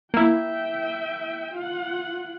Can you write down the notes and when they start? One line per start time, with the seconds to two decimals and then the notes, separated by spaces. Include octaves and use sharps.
0.14 A#3 E4 E5 G5
1.54 F4 F#5